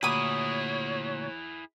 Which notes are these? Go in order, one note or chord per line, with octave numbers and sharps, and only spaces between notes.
D2 A#2 E4 F#4 G#4 C#5 B5 D#6